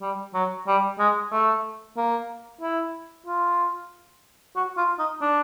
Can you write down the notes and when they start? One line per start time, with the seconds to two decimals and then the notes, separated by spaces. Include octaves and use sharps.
0.02 G3
0.34 F#3
0.67 G3
0.99 G#3
1.32 A3
1.97 A#3
2.61 E4
3.27 F4
4.56 F#4
4.77 F4
4.99 D#4
5.22 D4